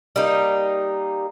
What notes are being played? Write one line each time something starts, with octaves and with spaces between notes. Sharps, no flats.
G3 A#3 D#4